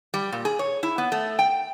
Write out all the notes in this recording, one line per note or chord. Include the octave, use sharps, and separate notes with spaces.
G3
A#2
G#4
C#5
E4
B3
A3
G5